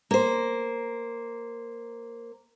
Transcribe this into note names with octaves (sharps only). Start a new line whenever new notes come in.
A#3 C5